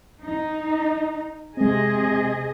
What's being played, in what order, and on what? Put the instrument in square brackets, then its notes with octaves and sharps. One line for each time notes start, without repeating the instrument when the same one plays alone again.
[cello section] D#4
[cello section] C3 G#4 D#5 [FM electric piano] G#3 C4